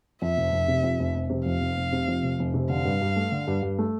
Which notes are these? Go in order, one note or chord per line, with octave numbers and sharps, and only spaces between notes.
F2 E5
F1
F1
C3
F2
F1
F1
C3
F2 F5
F1
F1
C3
F2
F1
F1
C3
D3 F5
G2
G2
A3
D3
G2
G2
A3